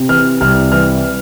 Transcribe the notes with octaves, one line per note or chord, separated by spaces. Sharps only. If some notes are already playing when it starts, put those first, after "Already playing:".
Already playing: C3
E3 F6
C2 F6
E3 F6